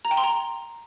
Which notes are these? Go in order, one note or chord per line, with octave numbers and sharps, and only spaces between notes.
A#5
G5
C6
A#5